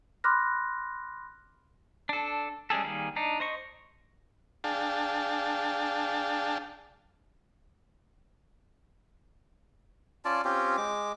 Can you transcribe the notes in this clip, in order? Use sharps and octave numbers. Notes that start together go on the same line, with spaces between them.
B5 C6 D6 F6 F#6 A#6
D4 A4
G3 G#3 C#4 G#4 A4
D#3 G3 A#3 G#4
D4 D#4
C5 D#5 C#6
D4 G#4 F5 G5 A5
C#4 F4 D5 A5
C4 C#4 F4 G4
G#3 D6